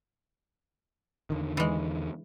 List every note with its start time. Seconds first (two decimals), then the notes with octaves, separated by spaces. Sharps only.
1.30 E2 D3 D#3
1.57 E3 G#3